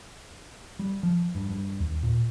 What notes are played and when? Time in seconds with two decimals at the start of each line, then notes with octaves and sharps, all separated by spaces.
0.79 G3
1.03 F3
1.35 G2
1.50 G2
1.80 D#2
2.03 A#2